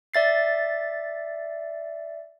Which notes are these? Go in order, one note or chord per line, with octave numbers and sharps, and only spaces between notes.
D5 E5 A6 C7